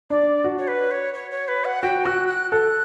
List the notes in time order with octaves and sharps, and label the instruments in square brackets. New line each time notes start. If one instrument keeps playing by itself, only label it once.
[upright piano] D4 [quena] D5
[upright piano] F#4
[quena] C#5
B4
C#5
C#5
C#5
B4
F#5
[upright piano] F#4 [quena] G5
[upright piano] F#4 [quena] F#6
[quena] F#6
[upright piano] A4 [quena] F#6